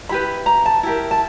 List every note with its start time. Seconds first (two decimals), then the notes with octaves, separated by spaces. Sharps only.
0.09 E4 G4 B4 B5
0.46 A#5
0.66 A5
0.83 E4 G4 A#4
1.11 A5